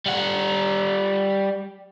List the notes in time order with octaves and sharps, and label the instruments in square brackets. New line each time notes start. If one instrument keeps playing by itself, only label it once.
[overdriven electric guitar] G3 F#5